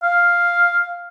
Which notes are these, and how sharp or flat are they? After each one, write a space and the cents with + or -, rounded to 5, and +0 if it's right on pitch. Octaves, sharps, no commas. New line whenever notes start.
F5 +0